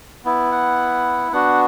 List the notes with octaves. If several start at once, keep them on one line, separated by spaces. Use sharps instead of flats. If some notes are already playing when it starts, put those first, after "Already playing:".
B3 E4
F#5
B3 D4 F#4 F#5